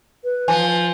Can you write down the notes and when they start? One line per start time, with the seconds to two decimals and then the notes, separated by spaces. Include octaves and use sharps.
0.24 B4
0.48 F3 G#5